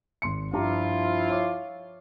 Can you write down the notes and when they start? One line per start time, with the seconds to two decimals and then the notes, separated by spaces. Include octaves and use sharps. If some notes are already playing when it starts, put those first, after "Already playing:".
0.22 G#1 C6 C#7
0.53 G2 F3 E4 F4 G4 A#5
1.29 C#5 F5 D6